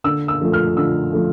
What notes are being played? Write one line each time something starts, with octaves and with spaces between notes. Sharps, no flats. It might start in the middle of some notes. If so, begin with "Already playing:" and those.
D3 E6
E6
F3 A3
F6
D3 E6
F3 A3